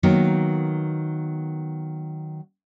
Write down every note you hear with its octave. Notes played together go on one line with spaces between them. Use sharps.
D#3 F#3 A#3 B3